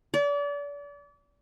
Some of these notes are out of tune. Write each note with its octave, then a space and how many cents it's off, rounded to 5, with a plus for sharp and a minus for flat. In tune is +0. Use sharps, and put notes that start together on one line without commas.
D5 -35